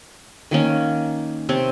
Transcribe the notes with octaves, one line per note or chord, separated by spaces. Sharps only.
D#3 A#3 C#4
C3 C4 C#5 A5